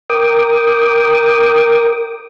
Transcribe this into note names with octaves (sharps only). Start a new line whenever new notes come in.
A#4 G5 D6 D#6